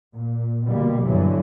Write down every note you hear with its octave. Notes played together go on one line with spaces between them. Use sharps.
A#2
B2 D3 G3 A#3
G2 D3 E3 F#3